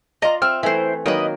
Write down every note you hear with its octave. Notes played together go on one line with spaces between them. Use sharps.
F4 D5 D#5 A#5
C4 E5 F6
E3 A3 E4 C5
D#3 F#3 A#3 B4 D#5